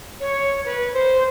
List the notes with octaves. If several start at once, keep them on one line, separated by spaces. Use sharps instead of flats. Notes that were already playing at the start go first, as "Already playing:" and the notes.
C#5
B4
C5